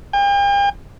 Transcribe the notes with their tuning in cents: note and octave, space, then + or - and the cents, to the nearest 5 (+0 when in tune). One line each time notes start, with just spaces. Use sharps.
G5 +45